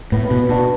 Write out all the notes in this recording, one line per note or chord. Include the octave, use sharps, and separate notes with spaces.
A2 B3
B2
B2 D4 F#4